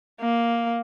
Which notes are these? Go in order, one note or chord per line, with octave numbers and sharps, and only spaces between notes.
A#3